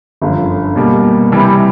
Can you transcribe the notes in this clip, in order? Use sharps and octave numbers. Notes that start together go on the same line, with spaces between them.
G1 F#2 D3 F3
B2 G3 A#3
C3 E3 G3